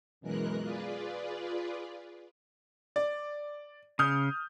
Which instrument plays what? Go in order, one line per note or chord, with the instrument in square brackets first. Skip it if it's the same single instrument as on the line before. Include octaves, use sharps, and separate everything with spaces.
[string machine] F#2 B2 E3 G#3 A#4 F#6
F4 G#4 B4 D5
[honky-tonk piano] D5
[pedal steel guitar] C#3 [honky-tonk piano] D#6 F6 G6